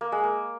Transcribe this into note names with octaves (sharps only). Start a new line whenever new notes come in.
A#3
G#3
A#3